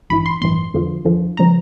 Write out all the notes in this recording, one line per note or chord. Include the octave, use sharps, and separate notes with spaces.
A1 G2 E3 B5
C6
A1 G2 E3 C6
F2 D3 F3
F2 D3 F3
C#3 F3 A#5